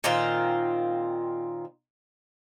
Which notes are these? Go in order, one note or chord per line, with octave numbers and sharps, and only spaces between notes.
A#2 D#3 C4 F4